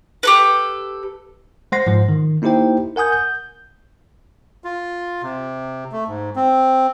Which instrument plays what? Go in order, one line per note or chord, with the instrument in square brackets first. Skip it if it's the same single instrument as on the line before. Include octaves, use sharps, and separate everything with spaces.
[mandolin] G4 A4 B4
[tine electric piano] G#3 C5 F#5 C6 A#6 C7
G#2 F3 C5
D#3
A#3 D#4 E4 G4 C5 G5
A#4 F#5 G#5 D#6 G6
G6
[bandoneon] F4
C3
A3
G#2
C4